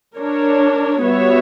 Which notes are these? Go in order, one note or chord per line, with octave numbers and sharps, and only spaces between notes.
D4 A#4 C#5
G3 B3 F#4 C#5 E5